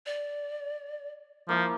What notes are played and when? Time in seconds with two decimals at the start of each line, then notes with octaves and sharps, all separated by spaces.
0.06 D5
1.49 F3 A#3 E4 A5